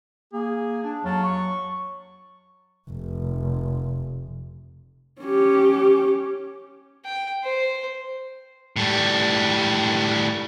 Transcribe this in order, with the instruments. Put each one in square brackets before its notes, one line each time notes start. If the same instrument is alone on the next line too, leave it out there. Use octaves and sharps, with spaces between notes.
[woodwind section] A#3 [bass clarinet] G#4
[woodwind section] D4
[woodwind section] F2 F5 A5 [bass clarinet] F#3
[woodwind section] C#6
[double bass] F1
[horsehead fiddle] C#4 G4
[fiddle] G5
C5
[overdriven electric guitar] A2 G3